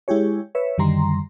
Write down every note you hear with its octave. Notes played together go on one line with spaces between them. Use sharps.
G#3 E4 G4 G#4 C#5
B4 C#5 E5
F#2 D3 D#3 G3 A#5 C6